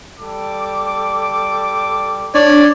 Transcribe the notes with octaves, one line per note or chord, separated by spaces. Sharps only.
G3 A4 D6
D4 C#5 D5